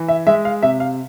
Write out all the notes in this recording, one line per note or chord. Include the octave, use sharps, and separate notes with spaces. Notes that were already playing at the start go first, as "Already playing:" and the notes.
Already playing: E3
E5
G#3 E5
F5
C3 E5
F5